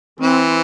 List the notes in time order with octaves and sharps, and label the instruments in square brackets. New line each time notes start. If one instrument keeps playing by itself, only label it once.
[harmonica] E3 [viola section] C4